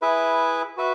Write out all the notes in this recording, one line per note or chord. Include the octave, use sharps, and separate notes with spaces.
E4 G#4 B4 E5
F#4 B4 E5